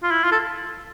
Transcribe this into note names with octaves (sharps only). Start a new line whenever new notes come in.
F4
E4
F4
A4